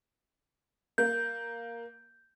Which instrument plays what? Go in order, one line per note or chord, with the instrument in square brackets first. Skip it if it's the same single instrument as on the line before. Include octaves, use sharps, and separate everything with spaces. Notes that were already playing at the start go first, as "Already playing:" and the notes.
[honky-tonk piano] A#3 [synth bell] G6